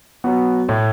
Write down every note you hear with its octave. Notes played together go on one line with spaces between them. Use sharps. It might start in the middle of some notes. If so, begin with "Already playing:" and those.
F#3 B3 F#4
A2